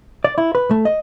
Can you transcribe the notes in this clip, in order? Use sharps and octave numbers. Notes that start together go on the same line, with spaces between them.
D5
E4
B4
A3
D#5